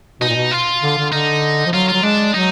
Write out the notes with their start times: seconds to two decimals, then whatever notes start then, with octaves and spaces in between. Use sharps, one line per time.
0.21 B2 D#4
0.29 A#2
0.36 B2
0.52 F4
0.83 D3
0.98 D3
1.12 D3 D#4
1.66 F3
1.73 F#3 F4
1.88 F#3 F4
2.03 G#3 D4
2.34 F#3 D#4